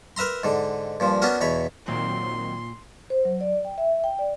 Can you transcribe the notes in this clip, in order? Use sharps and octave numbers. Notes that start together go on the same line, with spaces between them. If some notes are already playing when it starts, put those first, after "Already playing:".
A#4 B4 E5 A#5 C6
G#2 D3
G2 A#2 F3
B3 C#4 D4 F#4 A#4
E2 B2 C#5 B5
A#2 D#3 F#3 C4 C6
C5
F#3
D5
G5
E5
G5
D5